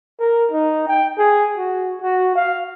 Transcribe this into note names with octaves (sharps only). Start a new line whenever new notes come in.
A#4
D#4
G5
G#4
F#4
F#4
F5